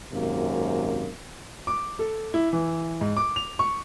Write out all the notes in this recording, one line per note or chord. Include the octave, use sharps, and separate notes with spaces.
G#1 F#2 C3 A#3
D6
A4
E4
E3
G#2
D6
F7
C#6